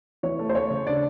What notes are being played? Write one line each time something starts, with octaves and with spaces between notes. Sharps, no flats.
E3 C#5
A3
C5
A3 C#5
C#3
D4 D5